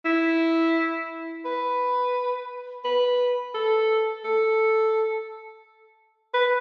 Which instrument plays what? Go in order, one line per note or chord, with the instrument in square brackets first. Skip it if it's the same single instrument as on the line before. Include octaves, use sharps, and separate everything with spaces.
[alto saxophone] E4
B4
B4
A4
A4
B4